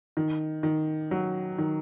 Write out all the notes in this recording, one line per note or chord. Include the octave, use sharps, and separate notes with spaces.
D#3
D#3
F#3
D#3